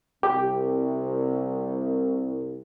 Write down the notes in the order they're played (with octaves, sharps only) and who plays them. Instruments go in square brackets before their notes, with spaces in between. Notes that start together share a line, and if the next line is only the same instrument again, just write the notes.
[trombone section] C2 [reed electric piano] G4